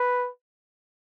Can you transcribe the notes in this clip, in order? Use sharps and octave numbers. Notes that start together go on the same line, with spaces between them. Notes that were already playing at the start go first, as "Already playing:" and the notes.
Already playing: B4